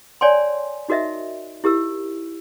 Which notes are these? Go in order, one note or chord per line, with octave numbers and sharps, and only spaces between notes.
C#5 D5 G5 G#5 C6
D#4 F#4 A#4 D#5 E5
E4 G4 A#4 E6